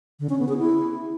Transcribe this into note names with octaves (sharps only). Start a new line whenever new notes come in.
D3
C#4
B3
G#4
E4